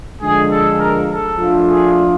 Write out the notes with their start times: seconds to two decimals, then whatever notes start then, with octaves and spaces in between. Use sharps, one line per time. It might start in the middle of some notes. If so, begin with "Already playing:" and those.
0.22 D3 F3 G#3 G#4
0.51 A4
0.80 A#4
1.09 A4
1.38 F3 A3 D4 F4
1.67 G#4